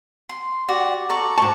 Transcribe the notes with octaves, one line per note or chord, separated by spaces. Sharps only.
C6
F#4 G4 D5
F#4 A4 D5 A#5 C#6
G#2 A5 C#6